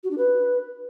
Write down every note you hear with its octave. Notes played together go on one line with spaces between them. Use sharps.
F#4
D4
B4